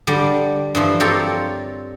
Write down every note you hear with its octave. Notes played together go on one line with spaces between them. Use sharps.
D3 G3
G2 E3 F3
C4 F4 G4 A4 A#4 C#5